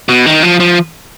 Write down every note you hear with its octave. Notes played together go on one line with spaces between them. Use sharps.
B2
D#3
F3
F3